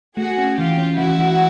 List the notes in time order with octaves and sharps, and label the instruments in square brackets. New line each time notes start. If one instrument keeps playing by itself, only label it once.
[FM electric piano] A3 [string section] F#4 G#4
[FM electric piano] C#4
[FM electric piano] E3 [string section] F4 G4
[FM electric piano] C#4
[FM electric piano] E3 [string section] E4 F#4
[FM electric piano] E3